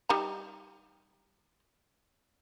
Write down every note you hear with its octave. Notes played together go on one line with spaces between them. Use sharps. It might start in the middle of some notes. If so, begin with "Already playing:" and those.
G3 D#4 A#5